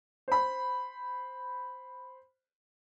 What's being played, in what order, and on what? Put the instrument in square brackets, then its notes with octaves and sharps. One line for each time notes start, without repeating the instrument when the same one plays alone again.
[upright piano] C5 B5